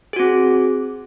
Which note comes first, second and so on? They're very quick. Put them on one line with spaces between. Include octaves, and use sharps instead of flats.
G#4 F#4 C4